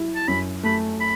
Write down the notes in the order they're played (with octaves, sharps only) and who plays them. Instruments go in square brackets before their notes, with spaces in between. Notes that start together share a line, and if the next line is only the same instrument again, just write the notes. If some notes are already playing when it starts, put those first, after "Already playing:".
Already playing: [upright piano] F#3 E4
[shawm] A5
[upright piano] F#2 [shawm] B5
[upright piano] A3 [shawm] B5
[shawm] B5